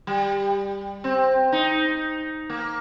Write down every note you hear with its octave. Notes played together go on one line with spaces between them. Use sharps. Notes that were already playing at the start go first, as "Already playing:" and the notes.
G3
C4
D#4
A#3